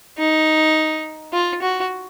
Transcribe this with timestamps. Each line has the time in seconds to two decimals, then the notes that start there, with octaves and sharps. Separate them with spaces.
0.18 D#4
1.33 F4
1.62 F#4